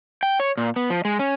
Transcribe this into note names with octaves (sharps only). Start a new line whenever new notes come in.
G5
C#5
A#2
B3
F3
G#3
C#4